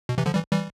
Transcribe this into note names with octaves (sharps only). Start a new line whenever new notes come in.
B2
C3 E3
D3 F3
E3 G3
E3 G3